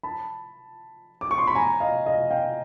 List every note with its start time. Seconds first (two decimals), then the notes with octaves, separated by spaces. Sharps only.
0.03 A5 B5
1.21 D6
1.31 C#6
1.38 C6
1.47 B5
1.55 G#5 A#5
1.80 D#5 F5
2.06 D#5 F5
2.31 F5 G5